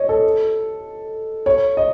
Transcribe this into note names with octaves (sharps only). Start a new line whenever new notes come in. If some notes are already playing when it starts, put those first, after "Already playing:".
Already playing: C#5 D#5
A4
C#5
D#5